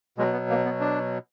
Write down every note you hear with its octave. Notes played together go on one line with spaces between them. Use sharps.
B2 F#3 G#3
B3
A#3
B3
D4